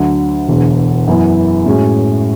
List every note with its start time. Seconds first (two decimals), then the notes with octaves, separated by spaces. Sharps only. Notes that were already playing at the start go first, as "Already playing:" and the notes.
Already playing: D2 D3 F#3
0.48 E1 E2 D3
1.08 F#2 E3 B3 E4
1.66 A2 G#3 C#4 F#4